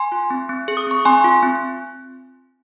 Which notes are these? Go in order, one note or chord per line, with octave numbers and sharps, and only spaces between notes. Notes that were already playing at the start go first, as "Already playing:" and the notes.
Already playing: G#5 C6
F4
C4
C4
G#4
D#6
C4 C#6
C4 G#5 C6
F4
C4